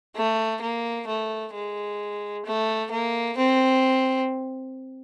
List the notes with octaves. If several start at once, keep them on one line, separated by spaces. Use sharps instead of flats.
A3
A#3
A3
G#3
A3
A#3
C4